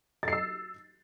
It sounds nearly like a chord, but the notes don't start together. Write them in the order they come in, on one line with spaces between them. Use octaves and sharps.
A6 C7 E6